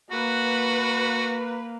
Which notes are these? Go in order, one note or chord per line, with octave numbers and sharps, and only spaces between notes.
A#3 F#4 B4